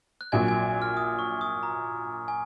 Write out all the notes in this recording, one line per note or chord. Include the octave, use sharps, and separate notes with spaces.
F#6
A#1 A#2 F#3 G#5 G#6
G#5 G#6
F6
D#6
C#6
D#6
A#5
G#5